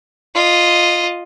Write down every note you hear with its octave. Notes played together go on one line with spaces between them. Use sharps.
F4 D#5